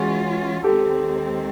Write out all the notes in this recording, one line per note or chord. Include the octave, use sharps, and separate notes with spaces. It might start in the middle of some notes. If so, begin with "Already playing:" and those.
Already playing: E3 G#3 C#4 F4 F#4 G#4
D#2 D#3 G#3 C4 G4 A4